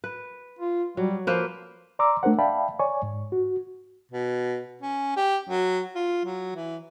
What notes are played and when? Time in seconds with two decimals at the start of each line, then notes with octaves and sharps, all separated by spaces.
0.04 B4
0.59 F4
0.97 F#3 G3
1.27 F3 A#3 B4 C5
1.99 D5 A#5 C6 D6 E6
2.23 A3 D4 A#4 C5 F#5
2.39 D5 E5 F5 G5 A5 B5
2.79 C#5 D5 G#5 C#6
3.03 G#2
3.32 F#4
4.12 B2
4.82 C#4
5.17 G4
5.50 F#3
5.95 F4
6.25 F#3
6.56 E3